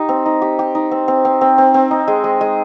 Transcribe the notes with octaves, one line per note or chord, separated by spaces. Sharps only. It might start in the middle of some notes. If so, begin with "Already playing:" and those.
Already playing: D#4 G4
C4
D#4
G4
G4
D#4
C4
C4
C4
C4
C4
C4
D#4
G#3
G#3
G#3